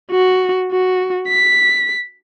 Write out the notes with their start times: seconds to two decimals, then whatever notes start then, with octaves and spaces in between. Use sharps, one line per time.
0.11 F#4
0.72 F#4
1.29 B6